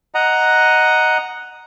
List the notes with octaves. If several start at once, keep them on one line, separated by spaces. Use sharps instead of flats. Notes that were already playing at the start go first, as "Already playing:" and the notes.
D#5 F#5 A#5